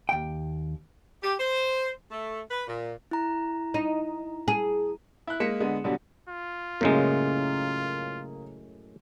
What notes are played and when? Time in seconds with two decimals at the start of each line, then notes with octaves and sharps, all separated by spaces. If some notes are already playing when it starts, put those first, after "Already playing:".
0.09 D#2 G5
1.23 G4
1.39 C5
2.11 A3
2.51 B4
2.67 A#2
3.11 E4 A#5
3.74 D#4
4.48 G#4
5.27 E4 F#6
5.40 G#3 A#3 B6 C#7 E7
5.60 D3 G#3 B3
5.84 B2 D3 F#3 G3
6.29 F4
6.81 F#2 A2 C#3 G#3 A#3